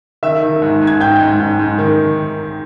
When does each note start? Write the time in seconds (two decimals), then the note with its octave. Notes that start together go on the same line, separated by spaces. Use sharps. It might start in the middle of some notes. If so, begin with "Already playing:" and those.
0.23 D#3 E5 E6
0.43 D#3
0.62 G#2
0.82 G#2
0.87 G#6
1.00 G#2 G5 G6
1.21 G#2
1.40 G#2
1.59 G#2
1.79 D#3